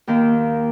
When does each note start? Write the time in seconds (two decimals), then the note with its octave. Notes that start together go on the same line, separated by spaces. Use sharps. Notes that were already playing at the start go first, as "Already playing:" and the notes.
0.07 D#2 D#3 A#3